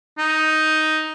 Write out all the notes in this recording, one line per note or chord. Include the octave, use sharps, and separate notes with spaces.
D#4